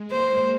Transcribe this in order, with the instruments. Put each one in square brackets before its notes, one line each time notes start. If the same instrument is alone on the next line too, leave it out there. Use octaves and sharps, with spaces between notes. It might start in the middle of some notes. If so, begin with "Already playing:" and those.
Already playing: [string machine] G#3
[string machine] A#3 [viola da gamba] C5